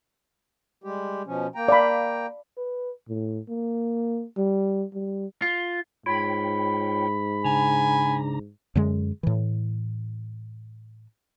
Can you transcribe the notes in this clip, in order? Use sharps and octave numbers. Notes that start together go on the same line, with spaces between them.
G3 G#3 G4
B2 F3 C#4
A#3 G5 A#5
D5 F5 B5
B4
A2
A#3
G3
G3
F4
G#2 F4 C#5 G5 B5
C#3 D4 G#5 A#5
F#2 D3 G#3
A2 E3